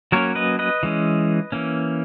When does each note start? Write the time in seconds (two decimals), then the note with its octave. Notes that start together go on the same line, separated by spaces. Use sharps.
0.12 F#3 A#3 C#4 A#4 C#5
0.35 B4 D#5
0.59 B4 D#5
0.83 E3 G#3 C#4
1.52 E3 A#3 C#4